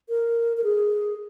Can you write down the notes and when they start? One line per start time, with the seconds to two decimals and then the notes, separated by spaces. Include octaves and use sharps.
0.09 A#4
0.57 A#4
0.64 G#4